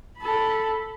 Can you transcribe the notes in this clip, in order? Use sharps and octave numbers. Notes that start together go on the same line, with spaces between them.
A4 B5